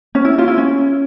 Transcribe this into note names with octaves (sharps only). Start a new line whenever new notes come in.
C#4
E4
F4
E4
C#4